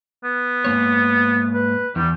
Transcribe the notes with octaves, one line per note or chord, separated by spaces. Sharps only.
B3
G#2 A#3 C#5
B4
E2 E3 G3